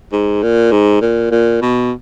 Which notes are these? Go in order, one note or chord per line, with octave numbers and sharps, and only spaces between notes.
G#2
A#2
G#2
A#2
A#2
B2